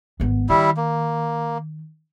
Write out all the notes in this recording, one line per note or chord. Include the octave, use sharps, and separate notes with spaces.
G#1 B3
D#3 G3 E4
A#3